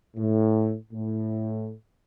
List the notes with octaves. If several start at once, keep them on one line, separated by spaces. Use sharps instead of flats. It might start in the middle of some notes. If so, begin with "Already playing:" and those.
A2
A2